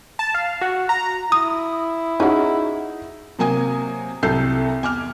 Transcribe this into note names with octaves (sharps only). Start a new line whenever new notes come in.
A5
F5
F#4
A#5
E4 D#6
C#4 D#4 F#4 G#4 F#5
C3 F#3 A#3 G#5 D#6
C2 F#3 A4 G6 C7
E2 G#5 D6 F6